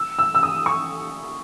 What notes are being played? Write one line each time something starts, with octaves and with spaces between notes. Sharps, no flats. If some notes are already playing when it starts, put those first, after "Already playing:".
Already playing: E6
E6
E6
D#6
C#6